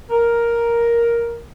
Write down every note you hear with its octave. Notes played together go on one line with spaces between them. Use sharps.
A#4